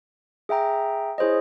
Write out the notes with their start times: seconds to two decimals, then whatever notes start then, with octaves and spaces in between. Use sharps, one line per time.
0.49 G#4 E5 G5 A#5
1.18 E4 G#4 C5 C#5 D#5